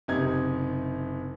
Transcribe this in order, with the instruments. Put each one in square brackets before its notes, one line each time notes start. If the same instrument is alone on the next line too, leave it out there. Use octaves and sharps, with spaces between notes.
[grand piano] F#1 C3 D#4 G#6